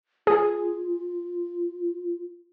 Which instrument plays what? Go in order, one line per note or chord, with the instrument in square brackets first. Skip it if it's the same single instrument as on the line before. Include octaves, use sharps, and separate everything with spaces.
[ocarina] F4 [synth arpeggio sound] G#4